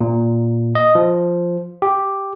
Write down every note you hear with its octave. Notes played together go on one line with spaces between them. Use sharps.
A#2
D#5
F3
G4